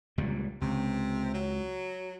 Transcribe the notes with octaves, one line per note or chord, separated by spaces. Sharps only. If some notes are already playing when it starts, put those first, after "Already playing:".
C#2 A#2 G3
C#2 C3
F#3